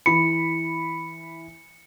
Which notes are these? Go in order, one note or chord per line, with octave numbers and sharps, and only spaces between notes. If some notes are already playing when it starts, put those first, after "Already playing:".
E3 B5 C#7